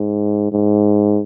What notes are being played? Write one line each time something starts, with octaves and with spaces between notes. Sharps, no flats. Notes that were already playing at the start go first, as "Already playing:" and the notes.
Already playing: G#2
G#2